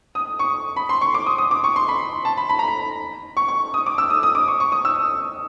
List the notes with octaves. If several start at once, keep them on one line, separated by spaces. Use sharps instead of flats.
D#6
C#6
B5
C6
C#6
D6
D#6
D#6
D6
C#6
C6
B5
A5
B5
B5
A#5
B5
C#6
C#6
D#6
D6
E6
D#6
D#6
D6
C#6
C#6
D#6
E6